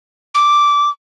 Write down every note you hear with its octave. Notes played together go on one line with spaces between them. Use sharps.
D6